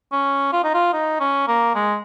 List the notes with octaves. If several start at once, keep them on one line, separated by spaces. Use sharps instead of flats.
C#4
F4
D#4
F4
D#4
C#4
A#3
G#3